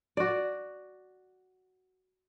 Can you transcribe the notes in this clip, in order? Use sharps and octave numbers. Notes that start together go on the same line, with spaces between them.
F#4 D5